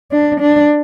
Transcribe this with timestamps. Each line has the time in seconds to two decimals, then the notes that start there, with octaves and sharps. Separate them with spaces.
0.11 D4
0.40 D4